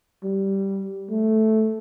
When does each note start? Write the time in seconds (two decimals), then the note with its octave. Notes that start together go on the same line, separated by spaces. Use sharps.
0.24 G3
1.10 A3